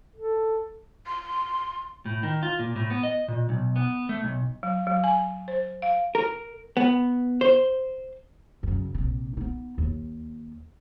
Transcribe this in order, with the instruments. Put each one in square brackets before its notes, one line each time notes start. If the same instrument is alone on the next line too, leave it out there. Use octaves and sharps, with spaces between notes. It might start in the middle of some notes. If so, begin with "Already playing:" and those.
[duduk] A4
[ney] C6
[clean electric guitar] A2
D#3
F4
A#2
A2
B3
D#5
A#2
B1
B3
A3
B1
[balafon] F#3
F#3
G#5
C5
F5
[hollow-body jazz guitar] A#4
B3
C5
[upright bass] F#2 C#3
A#1 C3
B3 D#4
D#2